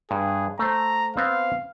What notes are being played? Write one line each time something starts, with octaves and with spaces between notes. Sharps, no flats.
G2 G#4
A3 C5 A#5
B3 C4 C5 F5